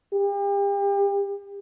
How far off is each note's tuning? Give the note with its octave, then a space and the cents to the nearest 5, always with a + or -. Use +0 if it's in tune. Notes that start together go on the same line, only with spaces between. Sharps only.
G4 +35